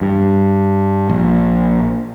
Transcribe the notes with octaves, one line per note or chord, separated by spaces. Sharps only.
G2
A#1